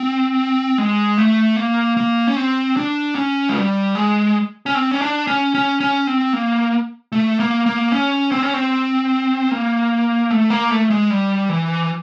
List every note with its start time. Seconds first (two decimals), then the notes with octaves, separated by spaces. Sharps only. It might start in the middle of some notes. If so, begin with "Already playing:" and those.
Already playing: C4
0.78 G#3
1.18 A3
1.56 A#3
1.97 A#3
2.27 C#4
2.36 C4
2.77 D4
3.16 C#4
3.49 G#3
3.56 G3
3.95 G#3
4.66 C#4
4.75 C4
4.91 C#4
5.01 D4
5.27 C#4
5.55 C#4
5.80 C#4
6.07 C4
6.33 A#3
7.12 A3
7.40 A#3
7.66 A#3
7.92 C#4
8.32 C4
8.43 C#4
8.54 C4
9.51 A#3
10.31 A3
10.50 A#3
10.71 A3
10.90 G#3
11.10 G3
11.49 E3